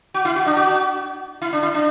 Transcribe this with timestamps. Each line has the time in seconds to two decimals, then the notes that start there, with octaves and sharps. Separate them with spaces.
0.14 F#4
0.25 E4
0.36 F#4
0.46 D4
0.57 F#4
1.42 E4
1.53 D4
1.63 E4
1.74 D4